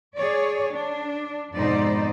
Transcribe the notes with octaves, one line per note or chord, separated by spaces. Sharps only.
G#4 C#5 D5
D4
F2 G#2 B2 D#4 C5 D5